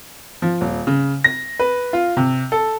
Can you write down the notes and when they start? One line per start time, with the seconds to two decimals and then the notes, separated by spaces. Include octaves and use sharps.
0.42 F3
0.61 D#1
0.87 C#3
1.24 A#6
1.59 B4
1.93 F4
2.17 C3
2.52 A4